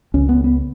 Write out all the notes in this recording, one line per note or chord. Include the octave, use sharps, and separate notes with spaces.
C#2 C#3 C#4
B3
B3